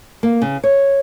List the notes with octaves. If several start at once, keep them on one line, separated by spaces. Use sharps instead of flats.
A#3
C#3
C#5